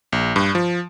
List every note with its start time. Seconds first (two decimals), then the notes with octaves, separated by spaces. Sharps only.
0.12 A#1
0.36 G2
0.55 F3